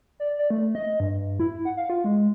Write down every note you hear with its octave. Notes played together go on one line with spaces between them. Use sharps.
D5
D5
A3
D#5
G2
E4
F#5
F5
F4
G#3